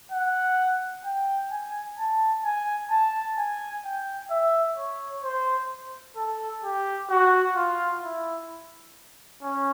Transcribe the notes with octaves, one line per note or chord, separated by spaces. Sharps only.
F#5
G5
G#5
A5
G#5
A5
G#5
G5
E5
C#5
C5
A4
G4
F#4
F4
E4
C#4